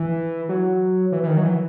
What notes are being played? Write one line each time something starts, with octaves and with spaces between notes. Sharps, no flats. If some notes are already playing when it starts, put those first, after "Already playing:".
Already playing: E3
F#3
E3
E3
D#3
F#3
E3